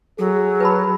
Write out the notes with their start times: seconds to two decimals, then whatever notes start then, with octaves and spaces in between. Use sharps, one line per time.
0.19 F#3 G#4 A4
0.60 B4 A5 B5